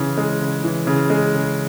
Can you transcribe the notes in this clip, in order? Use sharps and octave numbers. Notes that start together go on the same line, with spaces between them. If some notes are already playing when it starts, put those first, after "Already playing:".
Already playing: C#3 E3
G#3
C#3
E3
C#3
G#3
C#3